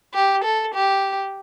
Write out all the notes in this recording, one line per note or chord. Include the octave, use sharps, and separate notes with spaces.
G4
A4
G4